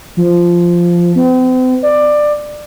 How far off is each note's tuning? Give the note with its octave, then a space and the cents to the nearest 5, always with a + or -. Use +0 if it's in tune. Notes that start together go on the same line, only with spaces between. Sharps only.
F3 -10
C4 -40
D5 +15